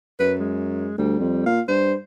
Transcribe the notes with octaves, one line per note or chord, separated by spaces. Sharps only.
F#2 B4
G#3
D2 G3
F2
A#2 F5
G2 C5